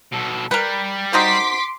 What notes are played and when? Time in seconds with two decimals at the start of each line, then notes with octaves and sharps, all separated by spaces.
0.12 B2 A4
0.51 G3 A#4 B4
1.13 D#4 F#4 C5 C6 D6 B6